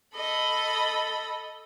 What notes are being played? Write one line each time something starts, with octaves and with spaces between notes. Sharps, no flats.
A4 D#5 B5